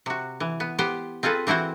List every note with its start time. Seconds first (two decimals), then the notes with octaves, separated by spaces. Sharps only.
0.06 C3 F#4
0.40 E3
0.60 B3
0.79 B3 G4 C5
1.23 C4 F4 G#4 A4 B4
1.47 E3 C4 E4 F#4 C5